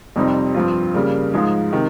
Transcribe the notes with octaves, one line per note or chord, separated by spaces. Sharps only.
F2 C3 G3 C4 D#4
G2 F3 C4 F4
C#3 G3 A#3
G#2 F3 G#3 D#4 G#4
C3 D#3